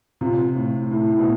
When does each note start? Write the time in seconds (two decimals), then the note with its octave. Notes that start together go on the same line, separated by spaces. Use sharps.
0.21 C3 F4
0.56 A2
0.91 A2 E4
1.19 B2